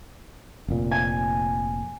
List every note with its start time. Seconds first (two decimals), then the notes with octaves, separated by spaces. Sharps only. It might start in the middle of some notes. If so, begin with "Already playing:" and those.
0.68 F1 A#2
0.91 G#5